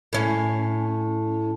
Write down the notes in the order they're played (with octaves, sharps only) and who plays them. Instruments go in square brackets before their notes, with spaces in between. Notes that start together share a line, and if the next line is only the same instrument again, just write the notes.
[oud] A2 C#4